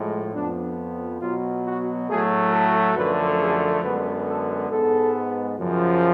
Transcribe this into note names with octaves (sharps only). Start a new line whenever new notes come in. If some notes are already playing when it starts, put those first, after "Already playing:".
Already playing: A2 F3 G#3
F2 F3 B3 D4
B2 F#3 B3 F4
F#4
A2 F#3 A3 G#4
A4
F#2 D3 F3 A3 B4
G#4
F#2 D3 G#3 B3 B4
A4
G#2 G#3 B3 A4
F#2 C#3 F3